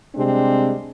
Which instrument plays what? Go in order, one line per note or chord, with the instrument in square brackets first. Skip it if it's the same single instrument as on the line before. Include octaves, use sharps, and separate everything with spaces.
[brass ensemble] C3 G3 G#3 C4 D4